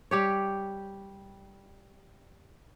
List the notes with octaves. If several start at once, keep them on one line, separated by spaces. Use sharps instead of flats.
G3 G4 C#5